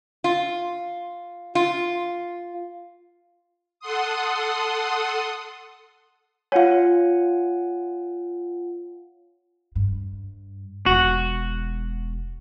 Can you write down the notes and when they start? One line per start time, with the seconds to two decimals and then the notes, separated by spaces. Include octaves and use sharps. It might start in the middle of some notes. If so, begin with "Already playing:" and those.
0.24 F4
1.55 F4
3.80 A4 F#5 C6 D#6
6.52 F4 C#5 F5 F#5 G#5
9.75 G2
10.86 E1 F#4